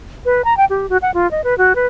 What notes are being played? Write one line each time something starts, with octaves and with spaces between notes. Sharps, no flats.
B4
A#5
G5
G4
F#4
F#5
F4
D#5
B4
F#4
B4